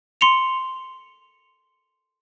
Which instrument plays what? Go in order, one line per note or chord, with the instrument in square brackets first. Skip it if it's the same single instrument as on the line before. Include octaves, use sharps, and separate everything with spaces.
[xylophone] C6 C#7 F7